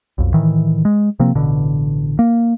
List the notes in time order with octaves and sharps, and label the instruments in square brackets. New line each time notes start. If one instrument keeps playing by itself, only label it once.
[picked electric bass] B1 F2
A2 D#3 E3
G#3
C3 F3 A#3 C4
A1 B2 D3
A#3